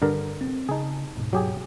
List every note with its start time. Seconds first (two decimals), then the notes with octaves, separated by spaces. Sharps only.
0.02 G2 D3 A#4
0.41 C4
0.69 C#3 D#4 G#4 A5
1.15 D2 G#2 B2
1.33 F#3 G4 G#4